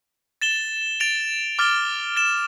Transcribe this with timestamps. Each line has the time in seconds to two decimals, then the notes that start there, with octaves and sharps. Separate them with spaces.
0.42 A6 E7 G7
1.00 A6 D7 F7
1.59 D6 F6 A6 D7 G7
2.16 A6 E7 G7